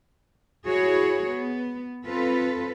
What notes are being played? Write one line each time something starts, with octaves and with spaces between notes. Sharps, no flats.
E4 F#4 G#4 C#5
B3
C4 F4 A4 B4